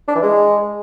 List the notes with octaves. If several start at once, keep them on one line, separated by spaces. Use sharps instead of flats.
D4
E3
G#3